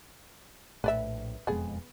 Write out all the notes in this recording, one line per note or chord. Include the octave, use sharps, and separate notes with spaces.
A#1 A2 A3 B4 D5 E5
E1 F2 G#3 B3 G#4